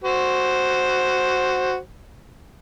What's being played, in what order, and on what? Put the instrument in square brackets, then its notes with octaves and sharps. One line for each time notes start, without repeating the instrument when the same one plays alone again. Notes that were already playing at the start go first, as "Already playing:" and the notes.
[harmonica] F#4 C5